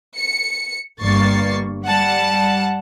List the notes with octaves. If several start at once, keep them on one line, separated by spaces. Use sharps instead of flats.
C#7
G1 G2 A#3 C#6 A6 C7
G3 F#5 A5